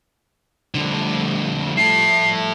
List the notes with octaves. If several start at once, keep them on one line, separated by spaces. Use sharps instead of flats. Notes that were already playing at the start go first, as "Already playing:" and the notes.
F2 D3 F3 G3 A3
E4 A4 C7